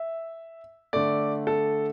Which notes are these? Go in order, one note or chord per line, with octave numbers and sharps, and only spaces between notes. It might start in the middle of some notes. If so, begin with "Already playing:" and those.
Already playing: E5
D3 A3 D5
A4